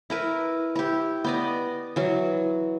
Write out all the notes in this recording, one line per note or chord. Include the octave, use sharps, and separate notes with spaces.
E4 A#4 B4
E4 G4
B3 D5 D#5
E3 F#3